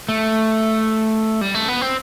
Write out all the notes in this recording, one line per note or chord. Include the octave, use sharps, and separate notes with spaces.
A3
G3
A3
B3
C4